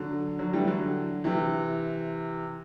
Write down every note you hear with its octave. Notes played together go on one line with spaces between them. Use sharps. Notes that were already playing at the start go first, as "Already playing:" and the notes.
Already playing: D3 F#3
D3 F#3
E3 G3
D3 F#3
C3 E3